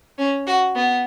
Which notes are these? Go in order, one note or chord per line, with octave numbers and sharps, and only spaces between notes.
C#4
F#4
B3